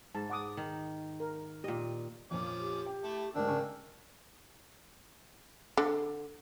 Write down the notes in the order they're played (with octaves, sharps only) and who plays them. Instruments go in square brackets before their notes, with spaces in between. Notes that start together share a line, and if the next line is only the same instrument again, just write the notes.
[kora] G#2 [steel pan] A5
[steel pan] F#5 D6 D#6
[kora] D#3
[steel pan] A#4
[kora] A#2 D#5 [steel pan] G4
[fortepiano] F2 A#2 [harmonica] F3 C#4 D6
[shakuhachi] G4
[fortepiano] G5
[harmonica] A3 E4 A4
[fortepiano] D2 G#2 G#3 [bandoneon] D4 [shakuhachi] A#4 [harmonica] G5 E6
[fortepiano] C#3 G#5 C#6
[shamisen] D3